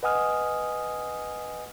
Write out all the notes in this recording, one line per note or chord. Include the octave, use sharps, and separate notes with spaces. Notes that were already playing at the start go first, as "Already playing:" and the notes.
B4 D#5 F#5 G#5 D#6 F6